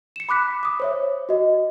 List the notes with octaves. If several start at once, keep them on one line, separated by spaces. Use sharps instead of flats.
C#7 E7
B5 D6 F#6 B6
D6 D#6
C5 C#5 E5
F#4 D#5